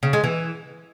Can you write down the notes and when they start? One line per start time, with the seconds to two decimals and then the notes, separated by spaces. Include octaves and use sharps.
0.03 C#3
0.13 G#3
0.24 E3